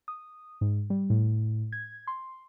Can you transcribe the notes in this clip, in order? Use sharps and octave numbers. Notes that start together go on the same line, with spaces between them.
D#6
G#2
G3
A2
G#6
C6